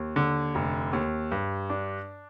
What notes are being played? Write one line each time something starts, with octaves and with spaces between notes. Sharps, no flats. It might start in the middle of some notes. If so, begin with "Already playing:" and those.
Already playing: D#2
D3
F1
D#2
G2
D4